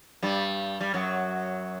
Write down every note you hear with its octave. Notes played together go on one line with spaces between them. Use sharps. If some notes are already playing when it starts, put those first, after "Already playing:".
G2 G3
G3
F#2 F#3